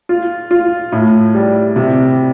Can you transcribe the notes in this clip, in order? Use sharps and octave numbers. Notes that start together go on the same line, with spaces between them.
F4
F4
A2
G3
C3